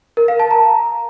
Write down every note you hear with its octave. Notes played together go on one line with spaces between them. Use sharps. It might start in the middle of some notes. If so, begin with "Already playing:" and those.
A#4
F5
A5
A#5